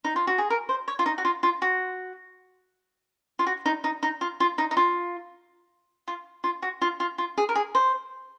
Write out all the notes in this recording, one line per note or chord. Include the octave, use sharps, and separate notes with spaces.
D#4
F4
F#4
G#4
A#4
C5
C#5
F4
D#4
F#4
F4
F4
F#4
F4
F#4
D#4
D#4
D#4
F4
F4
D#4
D#4
F4
F4
F4
F#4
F4
F4
F4
G#4
A#4
G#4
C5